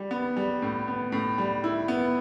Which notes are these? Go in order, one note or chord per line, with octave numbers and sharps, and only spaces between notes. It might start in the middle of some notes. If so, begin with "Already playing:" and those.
Already playing: G3
B3
G3
A2
B3
A2
G3
E4
B3